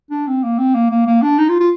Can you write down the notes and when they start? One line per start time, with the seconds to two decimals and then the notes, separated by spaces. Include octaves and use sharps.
0.11 D4
0.27 C4
0.43 A#3
0.58 C4
0.75 A#3
0.91 A#3
1.07 A#3
1.22 D4
1.38 D#4
1.49 F4
1.60 F4